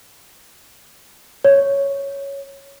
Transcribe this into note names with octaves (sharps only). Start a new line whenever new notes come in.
C#5